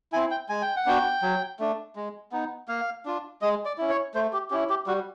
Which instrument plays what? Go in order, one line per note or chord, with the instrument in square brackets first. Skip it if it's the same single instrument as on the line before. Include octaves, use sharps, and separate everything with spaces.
[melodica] C4 E4 G#5
G5
G#3 G#5
G5
F#5
B3 D4 F#4 G5
F#3
A3 D4
G#3
B3 D#4
A#3 F5
D4 F4
G#3 D#5
D5
C#4 E4
C#5
A3 C5
G4
C#4 E4 G4
G4
G3 F#4